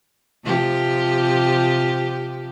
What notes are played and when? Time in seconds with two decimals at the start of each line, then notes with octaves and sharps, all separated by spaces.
0.44 C3 F3 G4